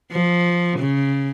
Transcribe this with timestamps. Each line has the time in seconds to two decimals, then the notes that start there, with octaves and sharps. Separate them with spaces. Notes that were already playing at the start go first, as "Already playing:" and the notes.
0.12 F3
0.80 C#3